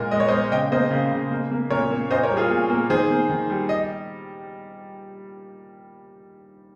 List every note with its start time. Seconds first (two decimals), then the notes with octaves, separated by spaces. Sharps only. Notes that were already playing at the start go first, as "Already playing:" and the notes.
Already playing: A#2 G#3 A#4
0.11 G#3 D#5
0.20 C#5
0.28 C5 D#5
0.32 G#3
0.51 C#3 D#5 G5
0.72 A#3 C5 D#5
0.91 C#3
1.11 C#3
1.31 A#3
1.51 A#3
1.70 A#2 A#4 C#5
1.91 A#3
2.11 A#2 C5 D#5
2.23 A#4 C#5
2.30 G3
2.37 F4 G#4
2.50 A#2
2.70 A#3
2.90 D#3 G#4 C5
3.10 A#3
3.29 D#3
3.50 G3
3.69 D#5